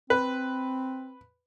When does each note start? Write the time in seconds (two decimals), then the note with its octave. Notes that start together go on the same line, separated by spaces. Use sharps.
0.10 C4 B4